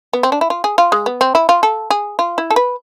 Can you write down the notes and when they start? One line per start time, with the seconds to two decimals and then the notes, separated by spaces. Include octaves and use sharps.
0.13 B3
0.23 C4
0.32 D4
0.41 E4
0.50 F4
0.64 G#4
0.78 F4
0.92 G#3
1.06 B3
1.21 C4
1.35 E4
1.49 F4
1.63 A4
1.90 G#4
2.19 F4
2.38 E4
2.50 A4
2.56 B4